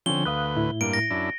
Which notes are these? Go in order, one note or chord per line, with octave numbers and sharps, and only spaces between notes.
D3 F3 C4 C#4 G7
D2 B4 F5 D#6 F#6
A2 E4
G2 A#3 D7
A#6
F#2 D4 E4